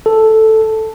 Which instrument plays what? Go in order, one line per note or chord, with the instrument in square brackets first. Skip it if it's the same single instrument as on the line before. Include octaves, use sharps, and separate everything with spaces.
[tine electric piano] A4